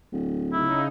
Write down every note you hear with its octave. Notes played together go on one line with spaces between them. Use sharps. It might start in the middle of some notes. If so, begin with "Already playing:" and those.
D1
C#3 D#4 E4